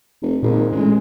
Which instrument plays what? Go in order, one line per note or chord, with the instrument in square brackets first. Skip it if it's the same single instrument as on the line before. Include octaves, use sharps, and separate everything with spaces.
[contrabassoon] F1
[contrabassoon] G#1 [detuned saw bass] A#2
[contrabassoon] A1 [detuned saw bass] G#3